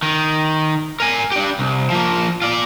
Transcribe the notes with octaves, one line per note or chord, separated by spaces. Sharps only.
D#3
A#4 G#5
D4 G4
C2
F3 A#3
F4 D5